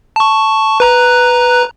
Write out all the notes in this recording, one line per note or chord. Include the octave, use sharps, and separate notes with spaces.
A5 C#6
B4 A#5 F#6